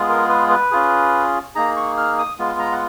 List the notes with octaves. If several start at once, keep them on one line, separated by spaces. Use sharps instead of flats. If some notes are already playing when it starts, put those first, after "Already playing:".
Already playing: G#3 B3 F4 G#4
A#4
B4
B4
C#4 F4 G#4
A#3 D#4 G#4 A#5
C#6
F6
D#6
G#3 B3 F4
A#5
F#5